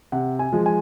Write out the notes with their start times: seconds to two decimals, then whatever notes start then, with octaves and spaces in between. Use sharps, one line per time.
0.12 C3 F#5
0.39 G#5
0.52 F3 G#3
0.66 G#5